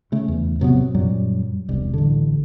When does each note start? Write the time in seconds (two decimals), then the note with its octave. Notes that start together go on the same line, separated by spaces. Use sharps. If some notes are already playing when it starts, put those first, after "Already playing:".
0.12 C#3 A3
0.28 E2
0.60 G#1 C3 F#3 B3
0.94 F#2 A#2 F#3 G3
1.69 E1 C2 G3
1.94 A1 D3